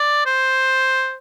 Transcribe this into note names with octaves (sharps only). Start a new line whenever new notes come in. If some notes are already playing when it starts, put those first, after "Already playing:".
Already playing: D5
C5